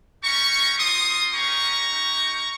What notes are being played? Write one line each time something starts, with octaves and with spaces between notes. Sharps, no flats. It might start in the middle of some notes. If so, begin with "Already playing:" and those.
G3 C#4 G4 A#5 C#6
C4 F4 C6 D#6
A#3 C#4 G4 A#5 C#6
A#3 D#4 G4